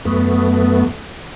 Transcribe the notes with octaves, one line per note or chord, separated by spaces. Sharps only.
F#2 A3 B3